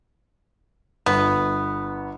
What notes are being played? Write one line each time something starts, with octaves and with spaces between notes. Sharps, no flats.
G1 B3